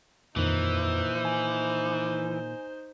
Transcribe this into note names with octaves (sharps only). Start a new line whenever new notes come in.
F2 A#2 D#3 E3 D#4 C5
G#5